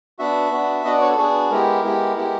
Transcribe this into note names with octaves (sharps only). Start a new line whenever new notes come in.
B3 D4 F#4 E5
B3 D4 F#4
B3 D4 F#4 D#5
D5
C#5
A4
B3 D4 F#4 G#4
G#3 B3 E4 G4 A#4
G#3 B3 E4 G4
G#3 B3 E4 G4